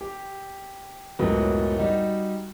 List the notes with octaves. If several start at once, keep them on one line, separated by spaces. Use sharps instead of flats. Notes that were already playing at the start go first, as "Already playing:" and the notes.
G4
F#1 C#2 A2 F#3 B3
G3 D#4 F#4